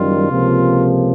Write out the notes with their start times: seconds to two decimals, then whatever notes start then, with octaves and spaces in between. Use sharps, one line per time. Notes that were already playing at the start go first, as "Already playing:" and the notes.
Already playing: F#1 F#2 D#3 G3 F4
0.29 C#2 C3 F3 A#3